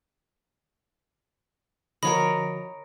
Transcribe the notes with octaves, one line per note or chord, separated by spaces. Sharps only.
D3 F3 F#4 A#4 C#5 D#5 B5